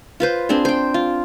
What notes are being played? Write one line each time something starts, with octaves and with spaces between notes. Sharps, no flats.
F4 B4 C5
C4 D4 G#4
C5 G5
F4